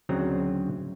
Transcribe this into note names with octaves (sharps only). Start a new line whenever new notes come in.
D2 C#3 F#3 C4 A#5